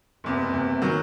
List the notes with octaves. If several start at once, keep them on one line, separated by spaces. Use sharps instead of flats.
F#1 E2 C3
F#1 E2 C3
D#3 F#3